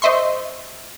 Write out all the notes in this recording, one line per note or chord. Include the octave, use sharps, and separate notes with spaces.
C5 D#5 E5 C6 C#6